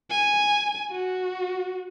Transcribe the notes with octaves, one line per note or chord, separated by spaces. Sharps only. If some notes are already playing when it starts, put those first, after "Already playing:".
G#5
F#4